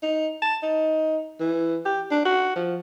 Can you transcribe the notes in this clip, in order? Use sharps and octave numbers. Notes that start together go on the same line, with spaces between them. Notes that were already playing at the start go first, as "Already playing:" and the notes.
D#4
A5
D#4
E3
G4
D4
F#4
F3